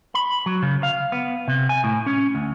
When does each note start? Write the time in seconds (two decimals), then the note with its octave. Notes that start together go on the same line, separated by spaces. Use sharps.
0.15 B5
0.46 F#3
0.62 C#3
0.83 F5
1.12 B3
1.48 C3
1.69 G#5
1.84 A2
2.06 C#4
2.35 D2